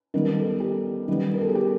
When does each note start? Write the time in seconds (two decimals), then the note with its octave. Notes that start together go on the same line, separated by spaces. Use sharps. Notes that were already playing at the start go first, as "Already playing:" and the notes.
0.14 D#3 G3 B3 A#4
0.37 A4
0.60 G4
1.08 D#3 G3 B3
1.34 A#4
1.41 A4
1.49 G#4
1.55 G4